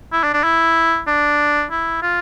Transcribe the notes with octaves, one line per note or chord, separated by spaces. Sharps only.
E4
D4
D4
E4
D4
E4
F4